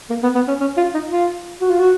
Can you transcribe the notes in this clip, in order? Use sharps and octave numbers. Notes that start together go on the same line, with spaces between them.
A#3
B3
B3
C#4
C#4
F4
D#4
F4
F#4
F4
F#4